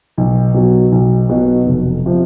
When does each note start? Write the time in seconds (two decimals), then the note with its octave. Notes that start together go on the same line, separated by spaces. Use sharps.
0.18 B1
0.54 B2 F#3
0.92 B1
1.29 B2 F#3
1.66 F1
2.06 C3 F3